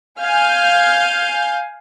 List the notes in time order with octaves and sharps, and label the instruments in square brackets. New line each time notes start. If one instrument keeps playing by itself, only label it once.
[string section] F5 G#5 F6 G6